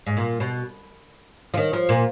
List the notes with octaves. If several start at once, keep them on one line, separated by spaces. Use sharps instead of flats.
G#2
A#2
B2
F3
D#3
F3
A#2